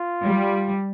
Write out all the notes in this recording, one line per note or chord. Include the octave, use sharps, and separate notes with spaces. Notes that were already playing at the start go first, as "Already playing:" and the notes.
Already playing: F4
G3